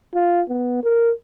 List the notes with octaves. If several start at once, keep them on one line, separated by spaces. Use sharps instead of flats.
F4
B3
A#4